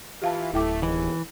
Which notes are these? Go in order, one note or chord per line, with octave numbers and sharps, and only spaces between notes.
E3 F4 G4 F5 A5
D1 A3 E4 G5 D6
D#2 B2 E3 G#3